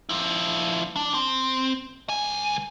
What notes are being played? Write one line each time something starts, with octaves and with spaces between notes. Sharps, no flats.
F3 E4
D4
C4
C#2 G#5